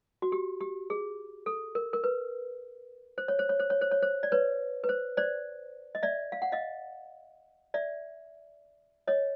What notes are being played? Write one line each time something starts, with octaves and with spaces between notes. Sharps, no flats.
F#4
G4
G4
G#4
A4
A#4
A#4
B4
C5
C#5
C5
C#5
C5
C#5
C5
C#5
C5
D5
B4 C#5
B4
C5
C5 D5
D#5
D5 E5
F5
F#5
D#5 F5
D5 E5
C#5 D#5